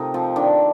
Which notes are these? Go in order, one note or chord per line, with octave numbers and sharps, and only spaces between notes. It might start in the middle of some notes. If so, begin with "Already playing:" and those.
Already playing: C3 A3 D#4 F4 A#4
F3 C4
D#3 D4